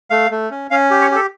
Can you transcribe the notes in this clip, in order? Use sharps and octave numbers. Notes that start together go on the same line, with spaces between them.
A3 F5
A3
C#4
C#4 F5
G4
C#5
G4 A4